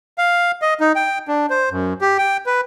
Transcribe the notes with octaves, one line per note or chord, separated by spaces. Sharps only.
F5
D#5
D#4
G5
D4
C5
F#2
G4
G5
B4